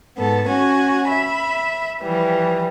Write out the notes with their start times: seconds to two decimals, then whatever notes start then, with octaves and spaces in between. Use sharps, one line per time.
0.17 G#2 B3 A4
0.48 C#4 F#4 G#5
1.09 E5 B5
2.03 E3 F3 G3